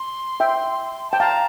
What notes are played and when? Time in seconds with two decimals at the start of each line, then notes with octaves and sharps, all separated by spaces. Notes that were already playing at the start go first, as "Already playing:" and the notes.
Already playing: C6
0.40 E5 G5
1.10 G5 A5
1.20 F5 A5 A#5